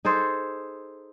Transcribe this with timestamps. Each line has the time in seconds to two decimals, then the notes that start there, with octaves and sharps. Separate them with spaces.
0.05 D#4 G#4 A4 C5